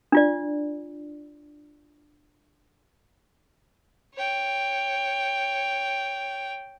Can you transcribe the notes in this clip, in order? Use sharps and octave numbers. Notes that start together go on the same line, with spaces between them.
D4 F4 D5
C#5 G5